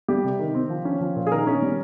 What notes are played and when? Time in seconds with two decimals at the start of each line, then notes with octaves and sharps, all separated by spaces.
0.08 G3 G4
0.24 C3
0.39 D#3
0.54 C4
0.70 F3
0.85 C#4
1.01 F3
1.16 A#2
1.27 G#4
1.32 D#3 A#4
1.47 C#4
1.62 G3